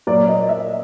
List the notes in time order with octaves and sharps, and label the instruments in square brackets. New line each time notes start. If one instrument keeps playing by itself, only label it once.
[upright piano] A#2 F#3 D5
D#5
E5